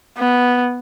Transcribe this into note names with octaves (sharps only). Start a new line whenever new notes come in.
B3